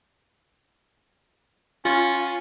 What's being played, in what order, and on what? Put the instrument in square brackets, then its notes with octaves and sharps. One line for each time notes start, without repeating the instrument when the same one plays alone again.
[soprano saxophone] C#4 [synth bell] F4